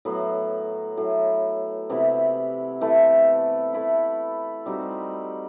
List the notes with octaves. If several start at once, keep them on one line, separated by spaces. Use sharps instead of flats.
A2 F#3 B3
A2 F#3 A3
C3 E3 B3 E4
E3 A3 E4
A3 E4 B4
G3 C4 D#4 F#4